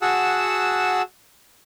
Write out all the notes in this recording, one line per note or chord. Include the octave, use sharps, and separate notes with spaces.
F#4 G#4 F#5 A5 E6